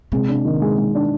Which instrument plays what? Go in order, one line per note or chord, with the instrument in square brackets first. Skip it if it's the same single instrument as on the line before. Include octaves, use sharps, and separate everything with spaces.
[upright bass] C3 [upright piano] G#3
[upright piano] D4
D#3
G#3
G#3
D4